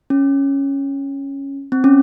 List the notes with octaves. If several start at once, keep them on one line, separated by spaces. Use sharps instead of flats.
C#4
C4
C#4